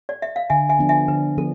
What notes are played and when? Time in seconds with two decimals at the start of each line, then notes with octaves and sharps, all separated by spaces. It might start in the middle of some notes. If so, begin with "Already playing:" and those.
0.09 D5
0.22 E5
0.36 F5
0.50 D3 E5 G#5
0.69 E5 G#5
0.79 F3 B3 D4
0.89 E5 G#5
1.08 D3 B4
1.38 F3 B3 A4